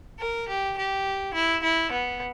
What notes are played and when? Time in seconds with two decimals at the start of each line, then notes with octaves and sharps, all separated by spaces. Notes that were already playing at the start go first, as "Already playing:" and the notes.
0.20 A#4
0.48 G4
0.78 G4
1.34 E4
1.63 E4
1.92 B3